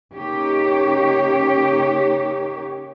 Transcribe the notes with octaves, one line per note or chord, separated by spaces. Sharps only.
C#3 A#3 D#4 G4 C#5